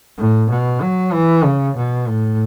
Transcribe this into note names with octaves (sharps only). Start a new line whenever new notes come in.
A2
B2
F#3
E3
C#3
B2
A2